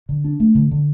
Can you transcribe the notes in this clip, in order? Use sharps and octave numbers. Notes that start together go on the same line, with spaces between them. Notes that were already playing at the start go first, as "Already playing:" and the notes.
D3
D4
A3
D3
D3